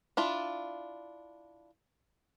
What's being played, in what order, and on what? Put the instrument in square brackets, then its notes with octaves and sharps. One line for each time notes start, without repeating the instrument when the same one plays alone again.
[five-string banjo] D4 E4 F4